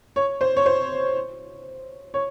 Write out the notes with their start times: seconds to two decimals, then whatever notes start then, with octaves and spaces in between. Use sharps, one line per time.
0.16 C#5
0.41 C5
0.56 C#5
0.66 C5
2.14 C#5